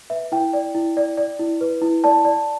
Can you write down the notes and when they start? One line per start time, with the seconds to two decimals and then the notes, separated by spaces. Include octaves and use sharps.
0.10 B4 E5
0.32 E4 G5
0.53 D5
0.75 E4
0.97 D5
1.17 D5
1.39 E4
1.61 B4
1.82 E4
2.04 D5 A5
2.25 D5